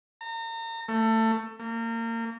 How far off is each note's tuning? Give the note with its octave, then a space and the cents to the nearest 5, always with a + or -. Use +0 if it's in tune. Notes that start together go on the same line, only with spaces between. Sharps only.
A#5 -35
A3 +20
A#3 -30